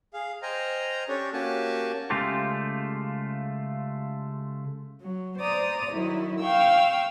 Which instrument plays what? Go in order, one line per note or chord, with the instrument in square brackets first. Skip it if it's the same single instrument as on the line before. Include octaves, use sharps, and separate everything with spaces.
[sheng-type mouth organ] G#4 F5
C5 D#5 G5 G#5 A#5 F6
C#4 D4 G4 A4 C#5
A#3 C#4 F#4 G4 G#5 A5
[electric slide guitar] C#3 G#3 A3 F4 G4 A4
[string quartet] F#3
C5 D5 A#5 D#6
D#3 F#3 E4
F5 G5 C#6 E6